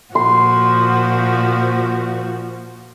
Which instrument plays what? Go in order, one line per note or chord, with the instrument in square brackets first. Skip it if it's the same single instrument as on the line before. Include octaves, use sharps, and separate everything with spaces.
[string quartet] A#2 F3 F#4 [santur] C6